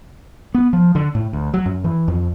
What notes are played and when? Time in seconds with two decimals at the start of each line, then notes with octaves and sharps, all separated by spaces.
0.54 B3
0.73 F3
0.95 D3
1.15 A2
1.33 D2
1.54 F#3
1.66 F#2
1.84 E3
2.08 F2